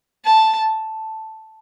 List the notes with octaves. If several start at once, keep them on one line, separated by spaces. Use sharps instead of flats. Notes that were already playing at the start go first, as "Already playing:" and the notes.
A5